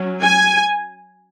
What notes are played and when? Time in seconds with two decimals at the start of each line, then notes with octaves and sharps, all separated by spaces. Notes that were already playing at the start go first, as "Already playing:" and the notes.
Already playing: F#3 C#4
0.22 G#5